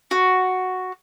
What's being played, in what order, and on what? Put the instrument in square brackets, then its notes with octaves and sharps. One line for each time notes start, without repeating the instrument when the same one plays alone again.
[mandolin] F#4